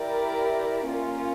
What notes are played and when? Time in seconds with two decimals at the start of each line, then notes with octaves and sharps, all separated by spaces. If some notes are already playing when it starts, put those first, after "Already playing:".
Already playing: E4 G4 A#4 D5
0.87 A#3 C#4 F4